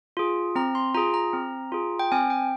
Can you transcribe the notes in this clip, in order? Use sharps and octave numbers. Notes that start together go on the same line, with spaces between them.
F4 G#4
C4 A#5
C6
F4 G#4 A#5
A#5
C4
F4 G#4
G5
C4 G#5
G5